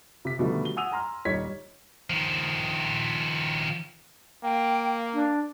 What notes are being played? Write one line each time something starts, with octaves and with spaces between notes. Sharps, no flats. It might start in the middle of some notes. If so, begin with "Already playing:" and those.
C3 B6
B2 D3 D#3 F3 G3 A3
G7
F#5 G#5 D#6 E6 D#7 F7
G#5 A#5 C6 F6
D#1 G3 D#4 C#5 G#6 B6
D#3 F3
A#3 G5
D4